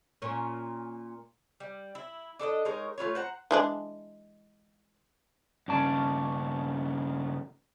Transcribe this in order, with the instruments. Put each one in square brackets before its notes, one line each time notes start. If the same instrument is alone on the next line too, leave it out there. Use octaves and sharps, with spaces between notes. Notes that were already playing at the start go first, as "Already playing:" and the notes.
[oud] A#2 C#4
[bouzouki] G3
E4
D4 A4 B4 D#5
G#3 D#4 A#4 C#5
A3 F4 B4 C#5
C5 F#5 A#5
[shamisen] E3 G#3 D4
[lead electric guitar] G2 C#3 [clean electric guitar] C#4 D5 A5